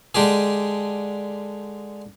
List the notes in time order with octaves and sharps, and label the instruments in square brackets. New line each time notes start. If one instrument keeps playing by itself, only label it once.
[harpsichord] D3 G#3 G4 G#4